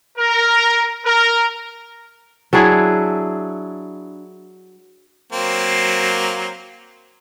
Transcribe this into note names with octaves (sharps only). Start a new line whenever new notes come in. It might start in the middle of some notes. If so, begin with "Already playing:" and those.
A#4
A#4
F#3 D4 E4 G#4
F#3 A#3 C4